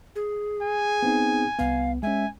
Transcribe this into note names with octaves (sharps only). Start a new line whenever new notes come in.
G#4
G#5
B3 C4 D#4
C2 B3 F5
G#3 C#4 E5 G#5